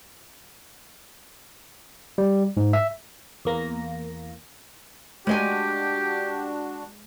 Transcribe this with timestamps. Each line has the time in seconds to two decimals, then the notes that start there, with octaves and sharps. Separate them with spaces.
2.18 G3
2.57 G#2
2.73 E5
3.45 E2 A#3 A#6
5.27 G#3 D4 F#4 G4 D#5 G#5